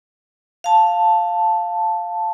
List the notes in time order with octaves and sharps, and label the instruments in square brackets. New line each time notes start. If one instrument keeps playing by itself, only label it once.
[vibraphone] F5 A5